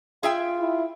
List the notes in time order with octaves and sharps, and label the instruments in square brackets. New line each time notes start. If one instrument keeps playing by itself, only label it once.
[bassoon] F4 [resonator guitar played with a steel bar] G#4 E5 G5
[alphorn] E4